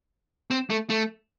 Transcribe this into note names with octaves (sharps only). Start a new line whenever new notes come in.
C4
A3
A3